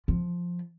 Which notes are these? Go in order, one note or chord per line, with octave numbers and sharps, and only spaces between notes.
F3